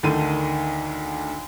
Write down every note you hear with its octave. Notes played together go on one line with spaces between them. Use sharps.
D2 D3 D#3 A4 D#7